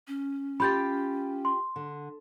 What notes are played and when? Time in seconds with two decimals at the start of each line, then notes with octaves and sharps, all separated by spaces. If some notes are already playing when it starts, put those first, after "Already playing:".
0.08 C#4
0.60 F4 G4 G5 B5 G6 A6
1.45 C6
1.76 D3